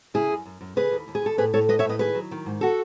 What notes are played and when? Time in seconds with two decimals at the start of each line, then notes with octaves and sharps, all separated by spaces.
0.14 C#3 E4 G#4
0.30 F#2
0.46 F#2
0.61 F#2
0.76 C#3 G#4 B4
0.91 D#2
1.08 D#2
1.15 G#4
1.22 D#2 A4
1.38 A2 G#4 B4
1.53 A2 A4 C#5
1.68 G#3 B4 D#5
1.79 C#5 E5
1.85 A2 B4 D#5
1.99 D#3 G#4 B4
2.15 F#3
2.31 D#3
2.46 G#2
2.61 F#4 A4